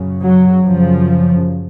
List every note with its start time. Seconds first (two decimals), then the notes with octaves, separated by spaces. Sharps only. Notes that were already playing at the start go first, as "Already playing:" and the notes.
Already playing: F#2 C#3
0.22 F#3
0.66 F#2 C#3 F3